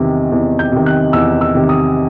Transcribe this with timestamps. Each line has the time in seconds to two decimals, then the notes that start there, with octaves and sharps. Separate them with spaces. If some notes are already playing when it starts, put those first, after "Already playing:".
Already playing: E2 C3 D#3
0.32 E2
0.59 G6
0.72 C3 D#3
0.86 F#6
1.13 E2 E6
1.41 E6
1.55 C3 D#3
1.69 D#6